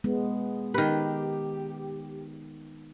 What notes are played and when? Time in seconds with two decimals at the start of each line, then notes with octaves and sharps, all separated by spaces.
0.04 G#3 B3
0.74 D#3 G4 B4